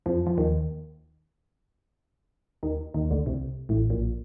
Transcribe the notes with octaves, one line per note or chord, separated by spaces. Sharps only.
F2 F3
F3
D#2 D#3
D#2 D#3
D#2 D#3
D2 D3
C2 C3
A1 A2
A#1 A#2